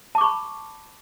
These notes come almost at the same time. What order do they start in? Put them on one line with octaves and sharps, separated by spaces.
A5 D6 C#6 B5